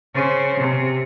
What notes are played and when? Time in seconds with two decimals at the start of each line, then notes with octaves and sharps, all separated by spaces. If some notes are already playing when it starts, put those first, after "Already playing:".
0.14 C#3 C5
0.59 C3